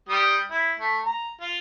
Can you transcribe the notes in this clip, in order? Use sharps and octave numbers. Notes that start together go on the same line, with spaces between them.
G3 G4 D#6
E4
A3
A#5
F4